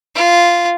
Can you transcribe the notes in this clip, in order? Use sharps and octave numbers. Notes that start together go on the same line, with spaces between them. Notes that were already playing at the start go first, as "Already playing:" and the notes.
F4